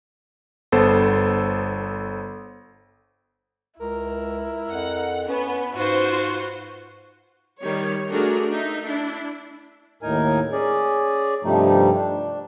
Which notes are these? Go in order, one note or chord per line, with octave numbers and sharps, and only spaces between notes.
G1 B3 A4 C5
C#2 E4 A#4
F2 F#5
B3 C#4 B4
G#2 F4 F#4 C5
D#3 G3 C#5
A3 D4 F#4 G#4 A#4
D#4 E5
D4 E4
D#2 A2 D#4 A#4 G#5
C#4 G#4 D5
G2 C3 F3 G3 A3 D#4
D4